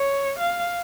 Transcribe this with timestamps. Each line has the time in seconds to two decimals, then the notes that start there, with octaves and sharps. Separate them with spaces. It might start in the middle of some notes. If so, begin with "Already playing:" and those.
Already playing: C#5
0.39 F5